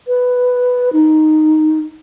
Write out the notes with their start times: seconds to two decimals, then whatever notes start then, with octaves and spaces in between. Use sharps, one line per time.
0.07 B4
0.93 D#4